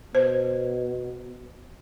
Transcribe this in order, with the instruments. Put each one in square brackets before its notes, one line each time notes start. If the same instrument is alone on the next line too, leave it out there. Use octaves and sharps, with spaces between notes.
[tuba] B2 [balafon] C5